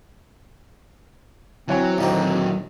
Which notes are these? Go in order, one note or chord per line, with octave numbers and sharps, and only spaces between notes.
E3 F#3 C4 C#5 G#5
D2 A#2 D#3 F#3 A#3